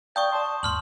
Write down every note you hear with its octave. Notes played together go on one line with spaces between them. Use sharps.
D5 F5 G5 A5 C#6 D#6 G6
D5 A5 C6
D#2 G#2 C6 F6 F#7